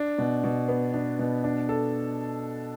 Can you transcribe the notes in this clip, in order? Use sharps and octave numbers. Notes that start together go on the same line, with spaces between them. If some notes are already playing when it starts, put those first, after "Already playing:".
Already playing: D4
B2
B2
B3
D4
B2
D4
A4